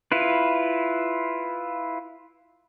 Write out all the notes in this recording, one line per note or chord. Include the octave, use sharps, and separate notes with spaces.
E4 F4 B4